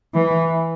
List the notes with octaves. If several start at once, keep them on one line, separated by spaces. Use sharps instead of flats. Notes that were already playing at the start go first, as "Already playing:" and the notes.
E3